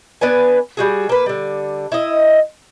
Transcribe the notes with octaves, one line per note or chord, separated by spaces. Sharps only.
B3 D4 B4 G#5
G3 F#4 G#4
A#3 B4
D3 G3
E4 D#5